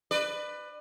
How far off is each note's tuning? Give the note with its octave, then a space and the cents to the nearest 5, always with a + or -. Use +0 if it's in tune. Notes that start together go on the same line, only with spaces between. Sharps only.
B4 +10 D5 +35